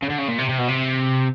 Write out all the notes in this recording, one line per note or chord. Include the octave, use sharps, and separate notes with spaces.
C#3
D3
C#3
A#2
C3
C3
B2
C3